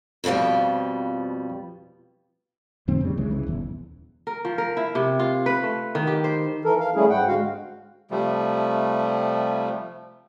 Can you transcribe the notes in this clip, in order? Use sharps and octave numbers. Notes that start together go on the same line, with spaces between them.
F2 B2 D#3 F3 G3
F2 A#2 D#3 C4
C#3 G3
C2 C#3 E3 G#3
C2 C#3 E3
D#1 E2
A#4
F3
A#4
E4
C3
F4
B4
A3
D#3
G4
C5
E3 A4 A#4
F5
G3 A3 C#4 E4 G#4
G#2 F#5 G5
D3 G#3 F#4 F5
C3 F3 G3 A3